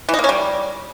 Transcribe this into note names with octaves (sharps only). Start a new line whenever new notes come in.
E3
D#4
A#3
C#4
G3